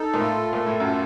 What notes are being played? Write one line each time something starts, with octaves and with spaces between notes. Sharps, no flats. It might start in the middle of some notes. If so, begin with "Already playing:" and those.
Already playing: D#4 A4
A#2
A2 F4
A#2 A4
A2
F#2
F4